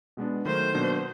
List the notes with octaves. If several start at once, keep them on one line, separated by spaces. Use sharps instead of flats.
B2 G#3 B3 D4
D#3 F#3 A3 C5
B2 F#3 A#3 D4